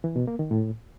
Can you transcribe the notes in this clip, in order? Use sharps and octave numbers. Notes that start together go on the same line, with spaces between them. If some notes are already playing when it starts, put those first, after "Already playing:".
E3
B2
A#3
D#3
A2